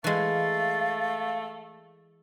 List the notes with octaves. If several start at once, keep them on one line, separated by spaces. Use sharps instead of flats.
E3 G#3 A3 F5 A6